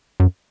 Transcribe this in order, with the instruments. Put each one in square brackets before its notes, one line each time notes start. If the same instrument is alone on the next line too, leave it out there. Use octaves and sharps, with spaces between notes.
[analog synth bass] F#2